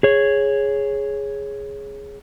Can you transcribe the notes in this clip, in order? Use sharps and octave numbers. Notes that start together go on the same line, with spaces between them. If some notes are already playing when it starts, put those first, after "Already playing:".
G#4 C#5